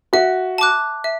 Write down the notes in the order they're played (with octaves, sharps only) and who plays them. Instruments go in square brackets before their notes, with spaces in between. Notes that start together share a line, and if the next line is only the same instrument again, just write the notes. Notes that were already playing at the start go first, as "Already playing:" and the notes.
[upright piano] F#4 [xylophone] E5
[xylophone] A5 D6 F#6
E5